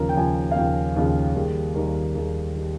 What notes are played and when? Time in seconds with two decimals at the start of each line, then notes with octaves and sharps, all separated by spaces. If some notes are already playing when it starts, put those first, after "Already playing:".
Already playing: D#2 C#3 F3 A#4
0.09 G5
0.16 D#2 C#3 F3 G#5
0.51 F5
0.56 D#2 C#3 F3 G5
0.96 D#2 C#3 F3 G#4
1.35 D#2 D#3 G3 G#4
1.75 D#2 D#3 G3 A#4
2.14 D#2 D#3 G3 G#4
2.54 D#3 G3